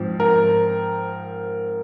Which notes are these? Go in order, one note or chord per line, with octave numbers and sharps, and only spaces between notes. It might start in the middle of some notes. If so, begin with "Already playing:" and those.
Already playing: G#2 F3 C4
A#4